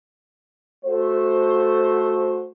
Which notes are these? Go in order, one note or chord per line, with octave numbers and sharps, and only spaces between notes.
A3 F#4 C5